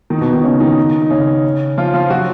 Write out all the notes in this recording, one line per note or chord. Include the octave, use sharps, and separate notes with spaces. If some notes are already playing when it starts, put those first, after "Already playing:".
D#3 D#4
B2 B3
D#3 D#4
C#3 C#4
D#3 D#4
D#4
C#3 C#4
F3 F4
F3 F4
F#3 F#4